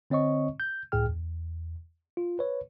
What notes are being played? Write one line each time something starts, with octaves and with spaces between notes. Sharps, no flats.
D3 C4 C#5 D#5 C#6
G6
C#2 A2 G#4 G5 F6
E2
F4
B4 C#5